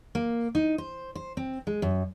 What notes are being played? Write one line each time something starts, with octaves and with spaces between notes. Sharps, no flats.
A#3
D#4
C5
C5
C4
G#3
F#2